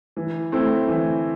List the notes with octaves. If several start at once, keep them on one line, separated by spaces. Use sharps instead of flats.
E3
A3 C4 E4
E3